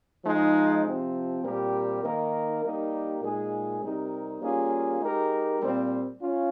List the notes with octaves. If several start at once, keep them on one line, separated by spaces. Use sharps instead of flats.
F3 G#3 D#4
C3 F3 C4
A#2 G3 C4 G4 A#4
D#3 A#3 D#4 A#4
G3 A#3 D#4 G4 A#4
A#2 G#3 D#4 G#4
C3 G3 C4 D#4 A#4
G3 A#3 C#4 F4 G#4
G#3 D#4 G4 A#4
A#2 G3 C4
C#4 F4